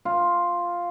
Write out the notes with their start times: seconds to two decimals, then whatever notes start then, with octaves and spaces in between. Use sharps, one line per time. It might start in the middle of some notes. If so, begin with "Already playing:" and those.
0.05 F4